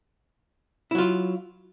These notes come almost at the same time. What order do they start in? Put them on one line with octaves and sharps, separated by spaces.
E4 F#3 F4